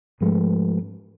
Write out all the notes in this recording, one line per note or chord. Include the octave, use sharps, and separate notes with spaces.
G#2 F3 G#3 A3